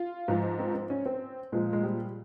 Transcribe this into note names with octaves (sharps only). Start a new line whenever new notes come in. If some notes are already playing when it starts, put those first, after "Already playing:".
Already playing: F4
G#2 F3
C4
C4
C#4
C4
A#2 F3 G#3
G#3
G3